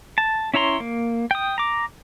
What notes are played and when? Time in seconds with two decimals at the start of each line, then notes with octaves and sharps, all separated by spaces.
0.18 A5
0.54 C#4 E4 C#5 A#5 C6
0.80 A#3
1.31 G5 D#6
1.58 A#5 D6